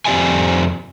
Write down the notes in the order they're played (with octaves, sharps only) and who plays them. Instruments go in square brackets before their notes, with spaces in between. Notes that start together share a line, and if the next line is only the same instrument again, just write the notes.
[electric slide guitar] F2 C4 G4 D5 E5 G#5